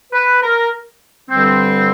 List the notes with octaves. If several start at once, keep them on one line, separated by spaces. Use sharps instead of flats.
B4
A#4
G2 D3 G3 C4